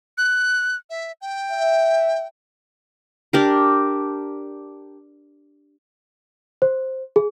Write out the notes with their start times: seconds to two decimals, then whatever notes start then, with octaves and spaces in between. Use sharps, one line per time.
0.18 F#6
0.90 E5
1.21 G5
1.51 E5
3.33 D4 G4 A#4
6.62 C5
7.16 G#4